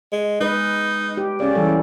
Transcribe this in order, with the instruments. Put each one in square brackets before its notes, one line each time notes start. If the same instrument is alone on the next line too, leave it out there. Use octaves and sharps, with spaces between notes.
[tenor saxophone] G#3
[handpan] G#3 B4 [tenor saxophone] D#4
[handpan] G4
[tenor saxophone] C#3 [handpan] C#4 D5
[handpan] E3 G3 A4